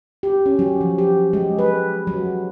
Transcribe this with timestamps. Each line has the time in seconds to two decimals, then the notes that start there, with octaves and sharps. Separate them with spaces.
0.23 G4
0.46 C#4
0.59 F#3
0.81 F3
0.98 G4
1.33 G#3
1.59 B4
2.07 F#3